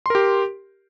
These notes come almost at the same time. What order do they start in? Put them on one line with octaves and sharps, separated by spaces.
C6 A#4 G4